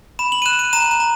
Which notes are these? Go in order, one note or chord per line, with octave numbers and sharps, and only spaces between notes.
B5 E7
F#7
D#7
F#6 E7
D#7
A#5 E7
E7
A#5